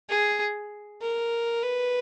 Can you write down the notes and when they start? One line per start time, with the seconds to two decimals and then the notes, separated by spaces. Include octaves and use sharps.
0.09 G#4
1.02 A#4
1.63 B4